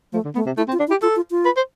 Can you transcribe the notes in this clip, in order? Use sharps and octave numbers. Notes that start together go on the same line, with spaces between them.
F3 A3
D3
A3 B3
C3
A3 E4
C4
F4
D4
E4
G4
F4 A4
F4
F4
B4
C5